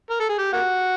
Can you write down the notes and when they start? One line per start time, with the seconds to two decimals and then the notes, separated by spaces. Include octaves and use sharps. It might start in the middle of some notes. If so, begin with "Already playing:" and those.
0.10 A#4
0.20 A4
0.29 G#4
0.39 G4
0.53 A#3 F#4